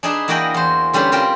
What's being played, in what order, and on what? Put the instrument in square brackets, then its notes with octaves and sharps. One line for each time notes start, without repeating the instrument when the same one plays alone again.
[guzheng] D4 D#4 G#4 B4 E5
E3 A#3 F#4 D#5 G5 B5
E2 C5
D3 G3 C#4 B4 C5
G3 C4 F4 A#4 C5